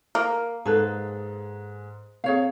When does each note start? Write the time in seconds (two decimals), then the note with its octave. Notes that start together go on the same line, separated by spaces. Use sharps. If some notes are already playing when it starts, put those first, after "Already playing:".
0.15 A#3 A#4
0.65 G#2 G#3 G#4 A4 B4
2.24 C3 G#4 C#5 F5